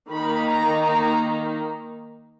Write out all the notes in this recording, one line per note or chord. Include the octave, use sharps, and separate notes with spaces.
D#3 A#3 D#4 B5
A#5
A#5